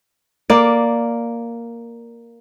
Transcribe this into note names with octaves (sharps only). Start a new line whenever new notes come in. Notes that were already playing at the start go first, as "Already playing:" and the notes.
A#3 D5